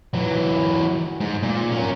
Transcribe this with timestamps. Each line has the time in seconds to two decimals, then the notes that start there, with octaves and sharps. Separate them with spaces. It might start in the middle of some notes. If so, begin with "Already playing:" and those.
0.14 E3 F#3
1.21 G#2
1.43 A#2
1.72 C#4 A#4